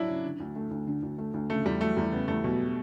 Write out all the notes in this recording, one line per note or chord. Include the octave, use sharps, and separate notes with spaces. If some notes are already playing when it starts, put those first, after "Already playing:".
Already playing: F#3 D4 E4
C#3
D3
D2
A3
D2
D3
D2
A3
D2
C#3 A3
E2 G3
F#3 A3
E2 G3
C#3 B3
E2 A3
B2 F#3